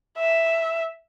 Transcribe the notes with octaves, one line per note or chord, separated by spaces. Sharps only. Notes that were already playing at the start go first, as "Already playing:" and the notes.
E5